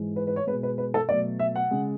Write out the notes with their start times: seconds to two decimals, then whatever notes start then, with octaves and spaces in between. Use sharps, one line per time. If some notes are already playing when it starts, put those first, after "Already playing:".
Already playing: G#2 E3 G#3
0.16 B4
0.27 B4
0.36 C#5
0.47 G#3 B4
0.52 B2
0.63 B4
0.78 B4
0.94 A4
1.09 B2 F#3 A3 D5
1.39 E5
1.56 F#5
1.71 C#3 G#3